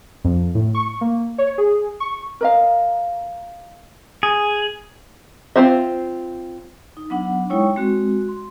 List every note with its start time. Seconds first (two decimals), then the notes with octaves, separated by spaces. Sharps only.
0.24 F2
0.55 A2
0.75 C#6
1.01 A#3
1.38 C#5
1.58 G#4
2.00 C#6
2.41 A#4 D#5 F5
4.23 G#4
5.56 C4 C#4 F4 C5 E5
6.97 D#4
7.10 F#3 B3 D4 F#5
7.50 G#3 D#4 E4 C#5 G5 C#6
7.76 G#3 C4 F#4
8.28 C6